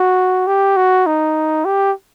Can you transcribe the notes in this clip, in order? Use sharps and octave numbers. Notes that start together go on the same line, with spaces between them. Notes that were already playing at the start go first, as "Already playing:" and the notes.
Already playing: F#4
G4
F#4
D#4
G4